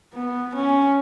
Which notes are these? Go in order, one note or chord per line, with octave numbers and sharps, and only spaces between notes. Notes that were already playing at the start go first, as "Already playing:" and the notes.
B3
C#4